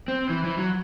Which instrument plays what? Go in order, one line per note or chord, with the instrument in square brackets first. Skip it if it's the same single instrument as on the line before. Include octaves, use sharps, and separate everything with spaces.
[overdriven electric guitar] C4
E3
E3
F#3